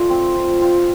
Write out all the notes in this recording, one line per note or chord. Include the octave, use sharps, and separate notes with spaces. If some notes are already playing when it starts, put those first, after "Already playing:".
Already playing: A3 F4 D5 G5 C6
C4
F3
F4 G5